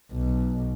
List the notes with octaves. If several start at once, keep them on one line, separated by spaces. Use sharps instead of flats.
B1